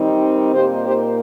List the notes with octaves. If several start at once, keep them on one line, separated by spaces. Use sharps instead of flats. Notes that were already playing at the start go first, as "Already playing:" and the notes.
Already playing: D#3 G3 C4 D#4
A#2 A#3 D#4 G4 C5
G4 C5